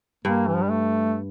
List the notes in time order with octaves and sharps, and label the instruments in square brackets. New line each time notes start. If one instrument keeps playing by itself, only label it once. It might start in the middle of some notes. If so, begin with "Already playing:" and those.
[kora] G2 [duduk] A#3
[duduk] E3
F3
G3
A3